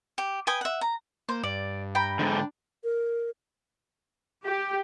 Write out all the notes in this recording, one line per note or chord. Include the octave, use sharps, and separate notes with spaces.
G4
B4 G5 G#5 D#6
E5 F#5
A#5
A#3 C5
G2 D5
G5 A#5 B5
G#2 D3 D4
A#4
G4